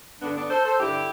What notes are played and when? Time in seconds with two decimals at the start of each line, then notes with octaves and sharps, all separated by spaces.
0.20 G2 D3 B3 D4
0.35 B3 D4
0.50 A4 C5
0.65 A4 C5
0.80 G2 D3 E4 G4